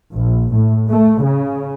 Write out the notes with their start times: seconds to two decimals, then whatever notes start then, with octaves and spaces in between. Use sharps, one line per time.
0.14 A#1
0.54 A2
0.89 A3
1.23 C#3